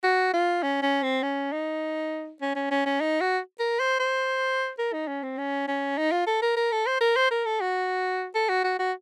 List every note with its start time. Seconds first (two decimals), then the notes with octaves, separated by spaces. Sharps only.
0.04 F#4
0.34 F4
0.63 C#4
0.83 C#4
1.03 C4
1.23 C#4
1.52 D#4
2.42 C#4
2.56 C#4
2.71 C#4
2.86 C#4
3.01 D#4
3.21 F#4
3.60 A#4
3.80 C5
4.00 C5
4.79 A#4
4.94 D#4
5.08 C#4
5.23 C4
5.38 C#4
5.68 C#4
5.98 D#4
6.12 F4
6.27 A4
6.42 A#4
6.56 A#4
6.72 A4
6.87 C5
7.01 A#4
7.16 C5
7.31 A#4
7.46 A4
7.61 F#4
8.35 A4
8.49 F#4
8.64 F#4
8.79 F#4